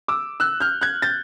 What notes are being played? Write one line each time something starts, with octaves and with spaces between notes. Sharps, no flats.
D6 E6
E6 F#6
F6 G6
F#6 G#6
G6 A6